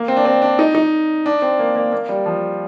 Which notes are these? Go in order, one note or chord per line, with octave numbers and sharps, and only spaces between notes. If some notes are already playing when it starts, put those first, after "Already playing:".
Already playing: A#3
C4
D4
C4
D4
D#4
D#4
D4
C4
A#3
A#3
A#3
G3
F3